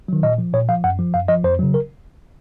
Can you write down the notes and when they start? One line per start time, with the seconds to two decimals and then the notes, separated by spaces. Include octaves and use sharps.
0.08 D#3 F#3
0.23 A#2 D#5
0.38 F3
0.53 A#2 C#5
0.69 F3 F5
0.84 F#2 F#5
0.99 F3
1.14 F#2 F5
1.28 F3 D#5
1.44 F2 C5
1.59 C#3 F#3
1.74 A#4